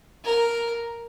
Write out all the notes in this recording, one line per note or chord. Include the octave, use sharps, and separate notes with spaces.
A#4